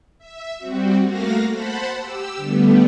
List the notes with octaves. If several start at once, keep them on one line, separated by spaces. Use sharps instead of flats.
E5
G3 C4 F#4
A3 A#3 F#4 F5 A#6
C5 F#5 A5 B5
G4 E6
D3 G3 A3 B3